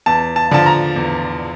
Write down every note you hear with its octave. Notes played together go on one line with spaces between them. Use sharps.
E2 A5
A5
D3 F3 A5
A#5
E2